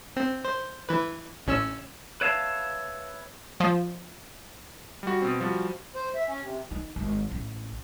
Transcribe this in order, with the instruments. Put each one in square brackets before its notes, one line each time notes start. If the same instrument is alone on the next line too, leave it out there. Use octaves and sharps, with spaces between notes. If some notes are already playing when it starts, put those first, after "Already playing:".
[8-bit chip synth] C4
C5
E3 B4
A1 C#4 E6
[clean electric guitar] B4 C#5 E5 F5 A5
[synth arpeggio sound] F3
[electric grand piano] G3 F#4
B2 C4
F3 G3 F#4
[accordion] C5
E5
C#4
C3
[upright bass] D#4
G#1
A1